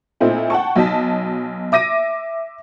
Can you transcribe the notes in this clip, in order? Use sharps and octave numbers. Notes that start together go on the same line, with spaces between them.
A#2 A3 C4 D#4 E4
F#5 G5 A5 C#6
B1 F#3 D#4 D#5 A5 B6
E5 D6 A#6 D#7